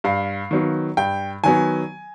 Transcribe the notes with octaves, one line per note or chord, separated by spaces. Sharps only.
G2 F5
D#3 F#3 B3
G2 G5
D#3 F#3 B3 G#5